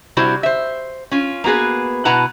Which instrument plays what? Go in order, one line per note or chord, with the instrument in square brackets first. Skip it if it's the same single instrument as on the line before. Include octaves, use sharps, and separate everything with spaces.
[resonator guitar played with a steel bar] C3 G3 E4 F#4 C5
C5 E5
C#4 F4
A#3 B3 F#4 G#4 B4
B2 E4 B4 F#5 A5 A#5